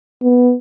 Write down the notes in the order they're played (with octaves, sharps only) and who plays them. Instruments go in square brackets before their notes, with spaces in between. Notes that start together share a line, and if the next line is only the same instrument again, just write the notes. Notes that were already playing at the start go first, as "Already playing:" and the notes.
[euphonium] B3